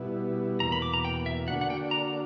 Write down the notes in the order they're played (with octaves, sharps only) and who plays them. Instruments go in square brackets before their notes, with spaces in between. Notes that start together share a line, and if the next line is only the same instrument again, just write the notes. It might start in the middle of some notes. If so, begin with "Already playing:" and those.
Already playing: [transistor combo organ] B2 G3 B3 E4
[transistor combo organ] E2 B2 A#3 [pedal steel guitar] A#5
[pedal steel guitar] B5
D6
A#5
G5
E5
[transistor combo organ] D3 A#3 D4 F#4 [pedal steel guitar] F#5
[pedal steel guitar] F#5
G5
A#5